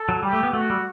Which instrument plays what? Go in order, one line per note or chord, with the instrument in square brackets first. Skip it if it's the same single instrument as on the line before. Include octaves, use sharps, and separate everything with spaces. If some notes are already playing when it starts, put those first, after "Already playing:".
Already playing: [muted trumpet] A4
[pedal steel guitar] F#3
[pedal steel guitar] G3 [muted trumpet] G4
[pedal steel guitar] A3
B3
[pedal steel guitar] A3 [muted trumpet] F#4
[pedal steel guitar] G3